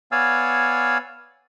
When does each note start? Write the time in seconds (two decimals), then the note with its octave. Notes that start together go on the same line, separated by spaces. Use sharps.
0.12 B3 C#5 D5 F5 G#5 E6